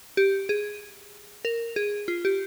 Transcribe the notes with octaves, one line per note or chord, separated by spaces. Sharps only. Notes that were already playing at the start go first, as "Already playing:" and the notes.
G4
G#4
A#4
G#4
F4
G4